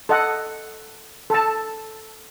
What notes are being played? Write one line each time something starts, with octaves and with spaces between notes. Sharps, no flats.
A4 D#5 F#5
A4 A5